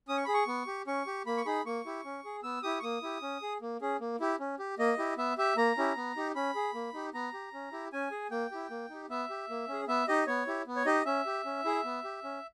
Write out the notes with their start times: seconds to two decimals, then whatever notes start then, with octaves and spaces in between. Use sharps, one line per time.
0.08 C#4 D#6
0.17 C#6
0.25 G#4 B5
0.34 C#6
0.47 B3
0.67 G4
0.87 C#4 C#6
1.07 G4
1.26 A#3 B5
1.37 C#6
1.45 D#4 G#4 B5
1.66 A#3 C#6
1.86 E4 G4
2.05 C#4
2.25 G#4
2.43 B3 E6
2.63 E4 G4 D#6
2.79 C#6
2.83 A#3 D#6
3.02 E4 G4
3.22 C#4
3.42 G#4
3.62 A#3
3.81 C#4 G#4
4.01 A#3
4.20 E4 G4
4.40 C#4
4.59 G4
4.79 A#3 D#5
4.98 E4 G4
5.17 B3 E5
5.38 G4 E5
5.57 A#3 A#5
5.77 C#4 E4 G4
5.97 B3
6.16 D#4 G4
6.35 C#4 B5
6.55 G#4
6.74 A#3
6.94 D#4 G4
7.14 B3 A#5
7.34 G4
7.53 C#4
7.72 E4 G4
7.93 C#4 G#5
8.11 G#4
8.31 A#3 G5
8.52 E4 G4
8.70 A#3
8.90 D#4 G4
9.10 B3 E5
9.30 G4
9.49 A#3
9.68 C#4 G#4
9.88 B3 E5
10.08 D#4 G4 D#5
10.27 B3 C#5
10.47 E4 G4
10.67 B3
10.76 C#5
10.86 D#4 G4 D#5
11.06 C#4 E5
11.26 G4
11.45 C#4
11.64 E4 G#4
11.85 B3
12.04 G4
12.24 C#4